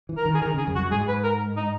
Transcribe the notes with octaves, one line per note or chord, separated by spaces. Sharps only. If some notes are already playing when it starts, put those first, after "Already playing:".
E3
A#4
D#3
G#4
D#3 A#4
C#3 G#4
F#2
F#4
F#2
G#2 G#4
B4
A#4
D#4